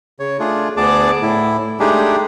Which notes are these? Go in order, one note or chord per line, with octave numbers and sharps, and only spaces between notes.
C#3 C#5
A3 D4 F4 G#4
D2 B3 G#4 D5 A5 D6
A2 E4
G#3 A3 D4 D#4 G4 G#4